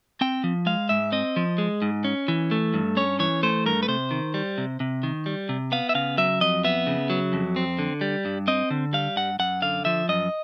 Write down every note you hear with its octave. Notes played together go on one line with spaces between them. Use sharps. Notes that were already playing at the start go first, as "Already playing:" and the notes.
C4 G5
F3
G#3 F5
G#2 E5
C4 D#5
F3
G#3
G#2
C#4
E3
A3
G2
C#4 C#5
E3 C#5
A3 C5
G2 A#4
B4
C3 C5
D#3
G3
C3
C3
D#3
G3
C3
B3 F5
E5
C#3 F5
F#3 E5
F2 D#5
B3 E5
C#3
F#3
F2
C4
D3
G3
G2
C4 D#5
D3
G3 F5
G2 F#5
F#2 F#5
D3 F5
F3 E5
F#2 D#5